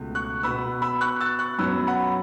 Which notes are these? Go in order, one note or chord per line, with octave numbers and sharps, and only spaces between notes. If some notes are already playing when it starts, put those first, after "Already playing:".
Already playing: C#2 B2 A3
C#6 F#6
B2 B3 B5 E6
B5 E6
C#6 F#6
E6 A6
C#6 F#6
F#2 F#3 B3 B5 E6
F#5 B5